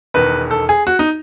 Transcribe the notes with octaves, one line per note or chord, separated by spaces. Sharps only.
E1 E2 D#3 B4
A4
G#4
F#4
D#4